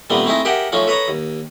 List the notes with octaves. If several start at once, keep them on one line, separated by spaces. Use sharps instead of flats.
A#2 D#3 G3 A3 B3 C4
A3 C4 D#4 E4 G#4 D#5
G4 G#4 A#4 E5 F#5 G5
F3 A3 C#4 D#4 F4
A4 B4 C#5 D#5 A#5
D#2